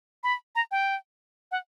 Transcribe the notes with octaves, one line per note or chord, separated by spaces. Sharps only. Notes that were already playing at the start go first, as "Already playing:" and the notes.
B5
A#5
G5
F#5